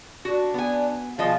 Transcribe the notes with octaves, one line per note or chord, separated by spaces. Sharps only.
D4 F#4
B3 G#5
B2 F3 F4 G#4 D#5 F5